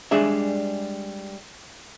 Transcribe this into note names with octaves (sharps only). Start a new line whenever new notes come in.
G3 G#3 D4 G#4 E5